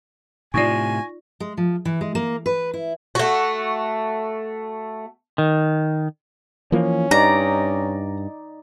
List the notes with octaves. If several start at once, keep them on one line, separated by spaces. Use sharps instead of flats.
A2 C3 D#4 F4 D5 G#5 C#6 A#6
G#3
F3
E3
G#3
A#3
B4
E4
A3 F#4
D#3
E3 F3 A#3 C#4
G2 D#4 D5 A#5